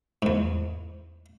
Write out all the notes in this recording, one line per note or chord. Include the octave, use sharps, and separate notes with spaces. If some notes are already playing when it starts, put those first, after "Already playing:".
E2 G#2